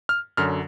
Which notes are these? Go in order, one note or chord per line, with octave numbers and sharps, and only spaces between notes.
F6
F#2 D3 F#3 F6